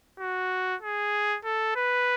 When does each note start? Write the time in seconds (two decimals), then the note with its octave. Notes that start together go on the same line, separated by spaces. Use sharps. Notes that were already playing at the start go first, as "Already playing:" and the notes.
0.19 F#4
0.82 G#4
1.44 A4
1.76 B4